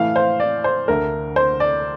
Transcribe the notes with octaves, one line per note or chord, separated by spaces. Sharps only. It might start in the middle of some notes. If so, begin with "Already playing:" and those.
Already playing: A2 E3 A3 F5
C5
D5
C5
D2 D3 A3 A#4
C5
D5